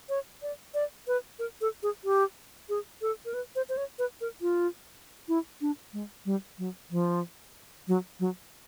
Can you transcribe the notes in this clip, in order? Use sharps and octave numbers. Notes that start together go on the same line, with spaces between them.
C#5
D5
D5
B4
A#4
A4
G#4
G4
G#4
A4
A#4
B4
C5
C5
C#5
B4
A#4
F4
E4
D4
G#3
G3
F#3
F3
F#3
F#3